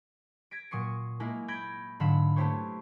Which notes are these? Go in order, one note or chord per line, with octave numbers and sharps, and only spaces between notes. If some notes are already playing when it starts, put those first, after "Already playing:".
G#6 A#6 B6 D7
A#2 F#3 C#6 D#6 C7 C#7
G#3 A#3 E4 A#4
B5 G6 G#6 A#6 D7
G#2 D3 F#3 F5 B5 E7
A3 B3 E4 G4 C5 C#5